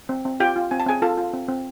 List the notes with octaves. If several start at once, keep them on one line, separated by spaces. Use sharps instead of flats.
C4
C4
F4 G4 G5
F4
C4 G#5
A5
C4 G#4 G#5
F4 A4 A5
F4
C4
C4